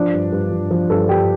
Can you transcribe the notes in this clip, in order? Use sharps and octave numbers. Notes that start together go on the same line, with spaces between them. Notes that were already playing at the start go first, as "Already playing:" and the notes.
Already playing: F3 D4
G2
G2
F3
F3
G2 A4
G2 G4